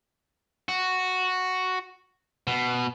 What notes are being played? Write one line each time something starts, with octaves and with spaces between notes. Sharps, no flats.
F#4
B2